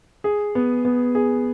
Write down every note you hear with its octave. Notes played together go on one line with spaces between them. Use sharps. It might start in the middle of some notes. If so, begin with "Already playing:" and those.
G#4
B3
B3
G#4